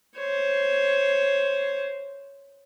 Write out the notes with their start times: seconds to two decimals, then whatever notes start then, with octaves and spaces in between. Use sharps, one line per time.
0.18 C5 C#5